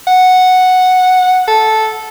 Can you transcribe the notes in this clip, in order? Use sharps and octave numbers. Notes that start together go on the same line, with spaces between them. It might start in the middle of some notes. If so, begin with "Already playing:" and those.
F#5
A4